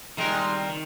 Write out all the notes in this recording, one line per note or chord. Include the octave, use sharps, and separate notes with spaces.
D#3 G3 G#3 C4 F4 A#4
D#3